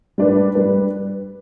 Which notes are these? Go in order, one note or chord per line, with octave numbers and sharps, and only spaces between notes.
G3 D4 B4
G3 D4 B4